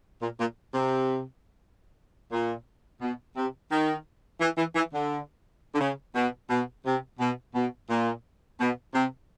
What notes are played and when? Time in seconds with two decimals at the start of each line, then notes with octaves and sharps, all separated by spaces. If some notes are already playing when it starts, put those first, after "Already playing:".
0.22 A#2
0.39 A#2
0.74 C3
2.31 A#2
3.01 B2
3.36 C3
3.71 D#3
4.41 E3
4.58 E3
4.76 E3
4.93 D3
5.75 D3
5.81 C#3
6.15 B2
6.50 B2
6.86 C3
7.20 B2
7.55 B2
7.89 A#2
8.59 B2
8.94 C3